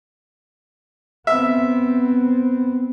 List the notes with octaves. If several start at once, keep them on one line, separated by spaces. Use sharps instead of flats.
B3 C4 E5